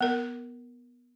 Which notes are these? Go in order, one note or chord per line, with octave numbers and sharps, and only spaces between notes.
B3 A#4